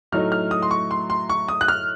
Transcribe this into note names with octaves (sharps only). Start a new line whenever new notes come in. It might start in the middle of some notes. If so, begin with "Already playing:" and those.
A2 F#3 A3 D#4 F6
F6
D#6
C6
C#6
C6
C6
C#6
D#6
F#6
F6